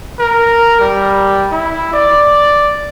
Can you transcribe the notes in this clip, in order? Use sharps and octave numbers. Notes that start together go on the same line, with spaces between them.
A#4
G3
E4
D5